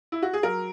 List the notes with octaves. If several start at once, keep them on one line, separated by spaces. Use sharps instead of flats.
E4
F#4
G#4
F#3 A#4